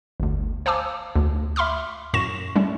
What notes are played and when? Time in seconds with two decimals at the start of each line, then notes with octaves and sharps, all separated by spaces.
0.20 G1 D2
0.66 C5 F5 G#5 A5 D6 E6
1.16 D2
1.56 E5 B5 C6 D6 F6
2.14 F#2 A2 C#6 A#6 E7
2.56 G3 A3 C#4